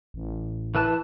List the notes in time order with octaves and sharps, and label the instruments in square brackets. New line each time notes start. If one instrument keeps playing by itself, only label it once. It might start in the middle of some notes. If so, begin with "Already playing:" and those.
[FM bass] A1
[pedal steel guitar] E3 B4 A5